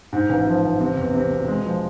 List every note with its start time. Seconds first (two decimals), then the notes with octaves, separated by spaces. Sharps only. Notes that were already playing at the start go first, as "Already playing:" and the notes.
0.13 G#2
0.30 A1
0.47 F3
0.64 A1
0.80 C3
0.98 E2
1.14 C3
1.31 E1
1.48 G#3
1.65 F3